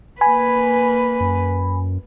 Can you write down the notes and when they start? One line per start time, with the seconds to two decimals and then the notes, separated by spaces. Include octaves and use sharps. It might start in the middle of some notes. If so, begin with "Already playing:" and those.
0.21 A#3 B4 G#5 B5
1.20 F#2